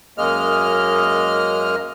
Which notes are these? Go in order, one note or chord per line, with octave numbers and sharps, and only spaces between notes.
F#2 G#3 A#3 D#5 F6